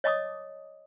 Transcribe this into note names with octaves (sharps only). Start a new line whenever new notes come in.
C#5 D#5 A5 D6 D#6